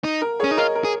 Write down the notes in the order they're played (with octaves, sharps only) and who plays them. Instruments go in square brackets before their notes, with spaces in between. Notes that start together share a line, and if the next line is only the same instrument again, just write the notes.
[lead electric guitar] D#4
[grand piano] A#4
G#4 C#5
[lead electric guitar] C#4
D#4
[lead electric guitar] F4 [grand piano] A#4 D#5
[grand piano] A#4
[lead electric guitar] G#4